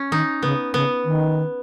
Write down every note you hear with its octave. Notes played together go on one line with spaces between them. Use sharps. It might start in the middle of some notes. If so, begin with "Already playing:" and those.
Already playing: C#4
D#3 D#4
C#3 B3
C#3 B3
D#3